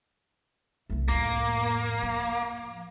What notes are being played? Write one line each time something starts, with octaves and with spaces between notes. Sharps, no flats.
C2 A3
F2 A2 A#3
F3